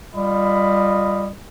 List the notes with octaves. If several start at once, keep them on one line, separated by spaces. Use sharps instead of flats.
G3 F4 D#5 B5